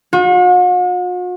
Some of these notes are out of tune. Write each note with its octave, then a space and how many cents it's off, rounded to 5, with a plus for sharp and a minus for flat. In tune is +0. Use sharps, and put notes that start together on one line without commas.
F#4 -45